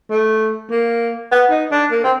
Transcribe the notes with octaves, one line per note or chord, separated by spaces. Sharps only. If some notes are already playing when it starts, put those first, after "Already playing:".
A3
A#3
B3
D#4
D4
A#3
C4